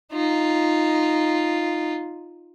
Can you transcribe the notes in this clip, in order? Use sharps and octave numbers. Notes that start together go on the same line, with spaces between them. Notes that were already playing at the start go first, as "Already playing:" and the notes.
D#4 F4